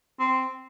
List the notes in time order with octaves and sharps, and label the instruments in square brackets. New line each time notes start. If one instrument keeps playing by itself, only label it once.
[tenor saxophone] C4